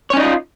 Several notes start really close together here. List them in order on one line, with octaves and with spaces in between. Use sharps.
C#5 C#4 D#4 D#5 F4